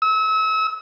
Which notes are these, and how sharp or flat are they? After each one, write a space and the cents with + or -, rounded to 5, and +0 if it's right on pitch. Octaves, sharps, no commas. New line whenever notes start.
E6 -35